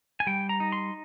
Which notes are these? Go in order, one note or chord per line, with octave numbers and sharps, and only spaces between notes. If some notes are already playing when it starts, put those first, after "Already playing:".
G#5
G3 G5
A#5
D#4
C6